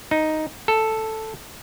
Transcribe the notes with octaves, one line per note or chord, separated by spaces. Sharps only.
D#4
A4